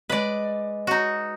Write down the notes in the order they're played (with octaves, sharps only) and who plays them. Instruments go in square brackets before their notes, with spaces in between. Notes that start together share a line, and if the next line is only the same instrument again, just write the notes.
[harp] G#3 D#5 [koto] B4 D5
[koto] D#4 F#4